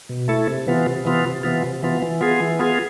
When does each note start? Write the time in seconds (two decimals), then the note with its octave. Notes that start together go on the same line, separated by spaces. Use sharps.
0.09 B2
0.28 A3 E4 A4
0.47 C3
0.67 E3 B3 F4
0.86 C3
1.05 E3 B3 F4
1.25 C3
1.43 E3 B3 F4
1.64 C3
1.83 E3 B3 F4
2.02 E3
2.21 B3 F4 G#4
2.40 E3
2.59 B3 F4 G#4